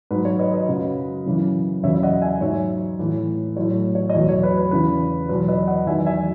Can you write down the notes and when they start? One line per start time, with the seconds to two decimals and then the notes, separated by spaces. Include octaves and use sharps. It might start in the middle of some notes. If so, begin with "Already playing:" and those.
0.11 G#2 F#3 B4
0.25 C#5
0.39 B4 D#5
0.53 B4 D#5
0.68 F#2 C#3 F#3
1.26 F#2 C#3 E3
1.83 E2 C#3 F#3 C#5 E5
1.94 E5
2.03 D#5 F#5
2.22 E5 G#5
2.41 G#2 F#3 C#5 E5
2.99 A2 E3
3.56 F#3 C#5
3.60 A2
3.95 C#5
4.10 D#5
4.14 E2 B2 F#3 C#5
4.29 C#5
4.43 B4
4.57 B4
4.71 E2 C#3 E3 B4
5.29 E2 B2 F#3 B4
5.48 B4 D#5
5.67 D#5 F#5
5.87 E2 D#3 F#3 E5 G#5
6.06 E5 G#5